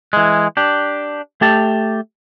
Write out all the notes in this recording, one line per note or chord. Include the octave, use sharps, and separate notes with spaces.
E3 G#3
D4 G4
A3 G4 A5